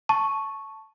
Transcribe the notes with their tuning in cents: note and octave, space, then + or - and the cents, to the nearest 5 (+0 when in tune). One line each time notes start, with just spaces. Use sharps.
A5 +0 C#6 +0